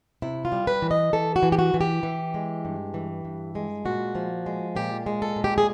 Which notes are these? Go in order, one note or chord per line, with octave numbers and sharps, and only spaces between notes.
C3 E4
F4
G3
B4
E3
D#5
E3 A4
F#4
E3
G4
F#4
E3
G4
E3
G#3
G2
E3
G2
G#3
A#2 F#4
F3
G#3
A#2 G4
G#3
A4
A#2
G4
G#4